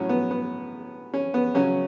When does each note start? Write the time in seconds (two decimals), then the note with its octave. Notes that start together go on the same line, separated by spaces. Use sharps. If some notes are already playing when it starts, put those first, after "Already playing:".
Already playing: A2 F#3 C#4
0.09 B3
0.31 B3
1.14 C#4
1.34 B3
1.54 C#3 F#3 C#4